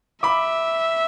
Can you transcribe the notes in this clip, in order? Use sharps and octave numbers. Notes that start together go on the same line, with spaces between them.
E5 B5 D6